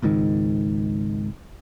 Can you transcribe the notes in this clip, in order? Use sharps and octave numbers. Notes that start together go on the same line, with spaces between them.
G#1 C#2 G#2 D#3